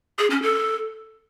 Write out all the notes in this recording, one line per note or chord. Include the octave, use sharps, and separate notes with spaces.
G#4
C#4
A4